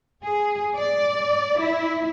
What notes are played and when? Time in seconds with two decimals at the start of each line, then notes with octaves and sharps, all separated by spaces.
0.22 G#4
0.76 D5
1.59 E4